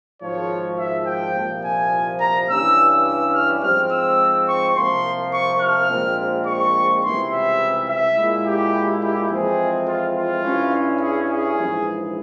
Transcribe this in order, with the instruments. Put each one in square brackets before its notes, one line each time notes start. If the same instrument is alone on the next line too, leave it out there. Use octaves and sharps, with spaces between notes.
[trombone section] G#1 G#2 F3 [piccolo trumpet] C#5
[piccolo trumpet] E5
G5
[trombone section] C2 A#2 F3
[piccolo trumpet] G#5
A#5
[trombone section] G2 E3 G3 C#4 [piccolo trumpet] E6
[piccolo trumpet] E6
F6
[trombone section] G#2 F3 C4 [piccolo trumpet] F6
[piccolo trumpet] E6
C#6
[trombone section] C2 C3 F3 A#3 [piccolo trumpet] C6
[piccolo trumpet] C#6
F6
[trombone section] A#1 A#2 G#3 C4
[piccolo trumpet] C#6
[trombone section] C#2 C3 E3 G3 [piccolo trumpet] C6
[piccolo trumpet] E5
E5
[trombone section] A#2 G#3 E4
[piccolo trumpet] G4
G4
[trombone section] F2 E3 G#3 C4 [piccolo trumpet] G#4
[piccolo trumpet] F4
F4
[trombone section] G2 G3 C#4 E4
[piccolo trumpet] G#4
G#4
[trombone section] A#1 G#2 E3